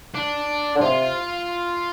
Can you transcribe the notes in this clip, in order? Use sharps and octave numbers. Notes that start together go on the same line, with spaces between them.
D4
D3
C3 F4